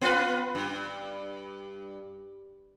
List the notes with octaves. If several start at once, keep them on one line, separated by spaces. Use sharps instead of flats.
B3 F4 B4
G2